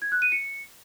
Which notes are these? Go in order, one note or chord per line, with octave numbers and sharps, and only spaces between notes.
G#6
F#6
D#7
C#7